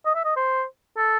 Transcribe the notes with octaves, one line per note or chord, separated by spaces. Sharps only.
D#5
E5
D#5
C5
A4